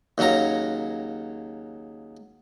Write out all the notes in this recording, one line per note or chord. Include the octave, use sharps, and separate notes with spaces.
D#2 C#3 F#3 C#4 A#5